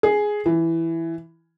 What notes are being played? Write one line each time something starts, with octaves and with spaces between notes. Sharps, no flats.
G#4
E3